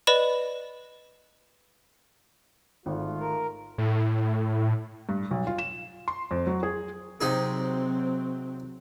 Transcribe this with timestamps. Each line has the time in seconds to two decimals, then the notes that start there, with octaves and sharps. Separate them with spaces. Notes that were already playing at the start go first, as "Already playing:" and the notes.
0.07 B4 D5 D#5 B5 E7
2.86 G#1 G#3 A3 F4
3.20 A#4
3.78 A2
5.09 G2
5.31 B1
5.47 F4
5.58 E7
6.08 C6
6.31 F2
6.47 F#3
6.63 G#4
7.21 C3 F#3 C4 D#4 G#4